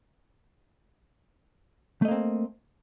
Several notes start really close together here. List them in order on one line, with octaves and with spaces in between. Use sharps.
A3 D#5 A#3 C4